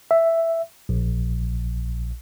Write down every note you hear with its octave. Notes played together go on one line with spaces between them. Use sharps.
E5
A#1